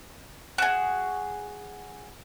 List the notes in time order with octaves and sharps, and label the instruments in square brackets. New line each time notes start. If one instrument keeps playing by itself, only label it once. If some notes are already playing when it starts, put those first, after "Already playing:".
[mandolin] F#4 G#4